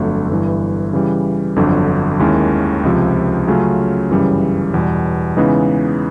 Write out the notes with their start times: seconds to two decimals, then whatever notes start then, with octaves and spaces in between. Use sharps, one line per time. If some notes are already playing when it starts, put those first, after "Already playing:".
Already playing: G1 F2 D3 F#3 A3
0.29 G1 G2 E3
0.93 C#3 E3 G3
1.56 G1 F2 D3 F#3
2.20 D#2 D#3 G#3 C#4 E4
2.83 C#2 C3 F3
3.48 C#3 F#3 A3 C#4 F4
4.10 G1 F#2 C#3 E3 G3
4.74 E2 B2 G3
5.37 C#3 E3 G#3 B3 D#4